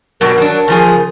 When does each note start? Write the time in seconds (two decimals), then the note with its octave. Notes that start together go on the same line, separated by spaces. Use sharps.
0.21 G2 B2 F#3 A#4
0.38 F#3 D4
0.68 C#3 F3 G#4